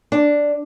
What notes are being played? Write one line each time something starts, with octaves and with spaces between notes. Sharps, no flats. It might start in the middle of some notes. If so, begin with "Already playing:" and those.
D4